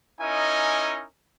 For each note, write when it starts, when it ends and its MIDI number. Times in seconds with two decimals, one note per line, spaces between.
0.21 1.05 61
0.21 1.05 63
0.21 1.05 64
0.21 1.05 70
0.21 1.05 75
0.21 1.05 80